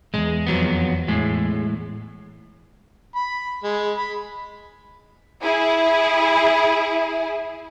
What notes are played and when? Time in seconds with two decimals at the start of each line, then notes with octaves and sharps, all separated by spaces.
0.14 B1 E2 G#3
0.46 F2 F#3 B3
1.08 A2 G#3
3.16 B5
3.64 G#3
3.97 B5
5.43 E4 G#4